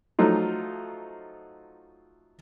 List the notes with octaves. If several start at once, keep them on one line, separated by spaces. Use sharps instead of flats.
F3 F#3 A3 D#4 F4